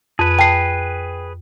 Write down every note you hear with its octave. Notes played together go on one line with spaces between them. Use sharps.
F2 G#4 B4
G5 A5 C7